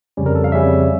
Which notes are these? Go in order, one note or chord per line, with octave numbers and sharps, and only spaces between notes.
F2 C#3 G3 C#4
A#4
A4
F5
F2 C#3 G3 C#4 E5